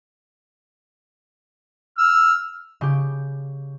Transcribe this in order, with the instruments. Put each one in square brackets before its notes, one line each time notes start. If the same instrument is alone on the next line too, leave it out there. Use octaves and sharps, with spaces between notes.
[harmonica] E6 F6
[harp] C#3 G4